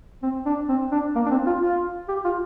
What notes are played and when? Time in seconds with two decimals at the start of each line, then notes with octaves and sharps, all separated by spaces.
0.23 C4
0.46 D4
0.69 C4
0.92 D4
1.16 A#3
1.26 D4
1.31 C4
1.47 F4
1.62 F4
2.09 G4
2.25 F4